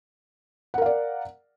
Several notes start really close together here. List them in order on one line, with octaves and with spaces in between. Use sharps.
F#5 A#4 F5 D5